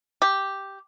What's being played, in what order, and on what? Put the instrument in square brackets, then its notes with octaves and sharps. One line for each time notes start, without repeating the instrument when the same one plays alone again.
[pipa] G4